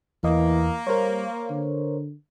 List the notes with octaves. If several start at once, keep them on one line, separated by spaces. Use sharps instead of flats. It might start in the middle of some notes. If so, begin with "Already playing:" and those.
E2 E3 A#3 D#5
G3 A#4 C5 C#5
D3